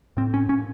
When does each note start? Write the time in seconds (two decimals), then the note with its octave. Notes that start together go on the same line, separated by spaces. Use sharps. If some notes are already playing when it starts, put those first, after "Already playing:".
0.17 A2 C4
0.34 C#4
0.49 A#2 C#4